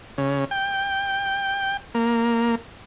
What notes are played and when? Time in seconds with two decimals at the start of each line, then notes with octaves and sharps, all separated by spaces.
0.18 C#3
0.51 G5
1.95 A#3